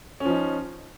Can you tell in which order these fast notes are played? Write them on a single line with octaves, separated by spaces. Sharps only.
C#4 F3 D#4